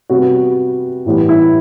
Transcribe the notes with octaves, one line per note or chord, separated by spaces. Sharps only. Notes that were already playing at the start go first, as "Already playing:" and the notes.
C3 G3 B3 F#4
A2 E3 G3 B3
E4